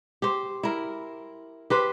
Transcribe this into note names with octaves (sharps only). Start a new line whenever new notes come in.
G4 C5
E4 A#4
G4 B4 C5